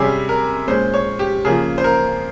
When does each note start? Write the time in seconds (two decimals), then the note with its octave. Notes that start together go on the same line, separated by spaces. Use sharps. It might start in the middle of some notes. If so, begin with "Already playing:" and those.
Already playing: C3 G3 C#4 G#4
0.29 A#4
0.67 A#2 G#3 C#4 C5
0.94 C#5
1.19 G4
1.45 C#3 F3 A#3 G#4
1.78 C5
1.84 A#4